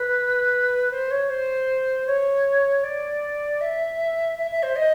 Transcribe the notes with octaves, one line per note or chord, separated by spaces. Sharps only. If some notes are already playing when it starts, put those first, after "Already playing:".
Already playing: B4
C5
C#5
C5
C#5
D5
E5
E5
E5
C5
D#5